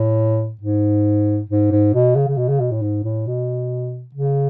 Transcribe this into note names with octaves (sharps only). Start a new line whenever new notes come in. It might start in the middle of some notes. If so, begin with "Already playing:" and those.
Already playing: A2
G#2
G#2
G#2
B2
C#3
C#3
B2
C#3
B2
A2
G#2
A2
B2
C#3